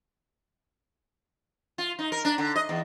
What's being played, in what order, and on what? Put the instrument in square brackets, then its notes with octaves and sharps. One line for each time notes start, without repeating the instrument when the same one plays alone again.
[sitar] F4
D#4
A#4
D4
D3
D#5
E2